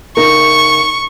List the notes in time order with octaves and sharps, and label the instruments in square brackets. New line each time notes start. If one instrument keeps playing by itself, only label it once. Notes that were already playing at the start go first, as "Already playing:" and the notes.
[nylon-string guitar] C#3 D#4 A#4 [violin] C#6